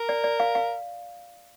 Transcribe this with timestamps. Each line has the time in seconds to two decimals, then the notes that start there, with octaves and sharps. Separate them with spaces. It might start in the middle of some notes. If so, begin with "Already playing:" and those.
Already playing: A#4
0.09 D5
0.24 D5
0.40 F5
0.55 F5